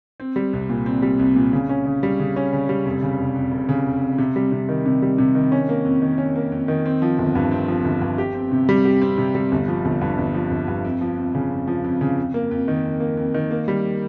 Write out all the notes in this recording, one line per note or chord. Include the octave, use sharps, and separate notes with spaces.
C4
G3
C2
A#2
C4
G3
C2
A#2
C#3
C#4
C#3
G3
C#3
C#4
C#3
G3
F1
C#3
F1
F2
F1
C#3
F1
F2
C3
G3
C3
D#3
C3
G3
C3
D#3
C#4
A#3
F2
D#3
C#4
A#3
F2
D#3
C4
F3
G1
G2
C4
F3
G1
G2
G4
C4
C3
G3
G4
C4
C3
G3
G1
F3
G1
G2
G1
F3
G1
G2
F2
F3
F2
C#3
F2
F3
F2
C#3
F2
A#3
F2
D#3
F2
A#3
F2
D#3
A#3
G3